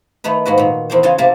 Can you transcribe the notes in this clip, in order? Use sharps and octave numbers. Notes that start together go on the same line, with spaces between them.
D#3 A3 D#4 B4
G#2 A#3 F#4 B4
A#2 D#3
E2 C4 C5
C#3 C#4 F4 F#4 G#5 C6
C3 A#3 A#4 E5 F5 A5